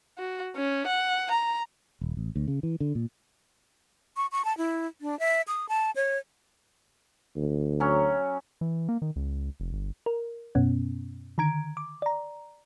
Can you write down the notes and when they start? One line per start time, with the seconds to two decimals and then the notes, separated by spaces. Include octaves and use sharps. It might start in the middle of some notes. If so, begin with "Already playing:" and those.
0.18 F#4
0.56 C#4
0.87 F#5
1.31 A#5
2.01 D#1
2.17 A1
2.36 D2
2.48 C#3
2.63 E3
2.80 D3
2.95 A#2
4.17 C#6
4.32 C#6
4.45 A5
4.57 E4
5.01 D4
5.19 E5
5.48 D#6
5.69 A5
5.96 C#5
7.36 D2
7.80 F#3 C#4
8.61 E3
8.89 A#3
9.02 D#3
9.16 C#2
9.60 F1
9.73 G1
10.06 A#4
10.55 F#2 B2 B3 C#4
11.38 D3 D#3 A#5 G#6 D7
11.77 D6
12.02 D5 A#5